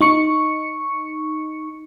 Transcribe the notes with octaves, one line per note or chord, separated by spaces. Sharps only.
D#4 C#6 C#7